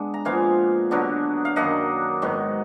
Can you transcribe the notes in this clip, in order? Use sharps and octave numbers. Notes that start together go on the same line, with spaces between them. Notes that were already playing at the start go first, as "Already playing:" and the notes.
Already playing: G#3 B3 D4
A#5
A#2 F3 G#3 B3 F5 G#5
D3 F#3 B3 D4
F5
F#2 D#3 A#3 D4 D#5 F#5
G#2 D#3 F#3 B3